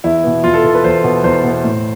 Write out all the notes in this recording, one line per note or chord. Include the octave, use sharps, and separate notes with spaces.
E2 E4
B2 B3
E2 F4
A4
B2 B3
B4
E2 C5
B2 B3
E2 C5
B2 B3
A2